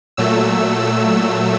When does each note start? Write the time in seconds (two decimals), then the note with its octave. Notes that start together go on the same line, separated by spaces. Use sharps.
0.17 A#2 F#3 A3 E6
0.81 E6
1.12 E6